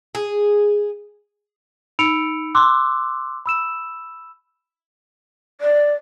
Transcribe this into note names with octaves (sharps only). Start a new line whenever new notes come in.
G#4
D#4 B5 E6 C#7 D7 F7
C6 D6 E6 F#6
B5 E6 E7
D5